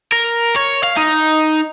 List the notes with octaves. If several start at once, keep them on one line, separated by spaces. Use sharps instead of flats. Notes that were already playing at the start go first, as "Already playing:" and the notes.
A#4
C#5
F5
D#4